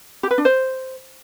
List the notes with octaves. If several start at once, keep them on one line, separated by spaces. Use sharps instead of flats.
G4
B4
D4
C5